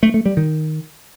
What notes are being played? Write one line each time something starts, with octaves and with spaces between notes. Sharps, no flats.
A3
A3
G3
D#3